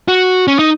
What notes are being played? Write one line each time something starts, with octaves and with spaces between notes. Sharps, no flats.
F#4
C#4
D#4